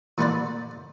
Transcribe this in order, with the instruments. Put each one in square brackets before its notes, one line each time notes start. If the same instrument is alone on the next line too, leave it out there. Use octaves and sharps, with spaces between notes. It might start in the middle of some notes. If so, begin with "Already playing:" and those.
[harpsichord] E3 A3 A#3 B4 C5 D5